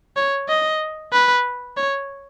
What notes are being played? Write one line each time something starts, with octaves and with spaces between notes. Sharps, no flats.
C#5
D#5
B4
C#5